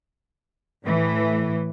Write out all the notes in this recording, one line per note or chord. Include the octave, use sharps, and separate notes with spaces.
A2 E3